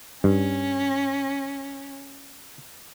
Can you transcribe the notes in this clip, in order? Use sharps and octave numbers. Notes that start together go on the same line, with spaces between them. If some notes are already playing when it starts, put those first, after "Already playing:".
G2 C#4